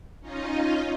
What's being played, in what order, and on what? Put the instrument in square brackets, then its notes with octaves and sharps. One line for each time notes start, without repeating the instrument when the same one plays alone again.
[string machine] C#4 D#4 F4 D#5